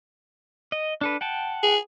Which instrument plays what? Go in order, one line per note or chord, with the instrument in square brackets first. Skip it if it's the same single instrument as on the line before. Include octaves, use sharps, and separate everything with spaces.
[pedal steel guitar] D#5
D4 A4 B4
F#5 G5 A5
[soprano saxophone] G#4